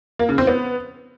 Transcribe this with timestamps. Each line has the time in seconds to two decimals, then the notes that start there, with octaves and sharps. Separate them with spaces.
0.19 A#3
0.29 C#3
0.38 C4
0.47 B3